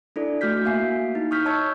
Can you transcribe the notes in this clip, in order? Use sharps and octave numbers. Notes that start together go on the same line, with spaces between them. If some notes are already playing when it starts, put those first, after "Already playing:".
D4 E4 A4 D5
A3 F#4 F6 G6 B6
A#3 F#4 E5 F5 G#5 C7
D#4 E4
C#6 D#6 F6 G6 B6
C#5 D#5 A5 C#6 E6 G#6